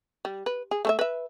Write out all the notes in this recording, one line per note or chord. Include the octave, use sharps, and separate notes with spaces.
G3
B4
G#4
A3 A4 E5
B4 E5